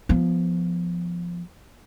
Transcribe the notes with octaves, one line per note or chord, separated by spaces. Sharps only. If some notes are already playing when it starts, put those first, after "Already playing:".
F3 B3